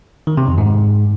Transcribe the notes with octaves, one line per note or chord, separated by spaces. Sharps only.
D#3
C3
F2
G#2